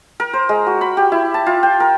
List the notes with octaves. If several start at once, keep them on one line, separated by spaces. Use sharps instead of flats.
A#4
C5
G#3
F#4
B5
G4
E4
A5
F4
G5
A#4